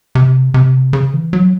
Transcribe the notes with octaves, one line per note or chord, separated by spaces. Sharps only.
C3
C3
C#3
E3
F#3